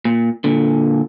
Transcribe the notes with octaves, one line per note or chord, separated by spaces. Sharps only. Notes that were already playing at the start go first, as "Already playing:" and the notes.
A#2
A#2 D3